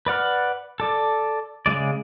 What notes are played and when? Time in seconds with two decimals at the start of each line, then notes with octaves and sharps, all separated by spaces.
0.06 B4 D5 F#5 F6
0.80 A4 D5
1.66 C#3 F3 G#3 D5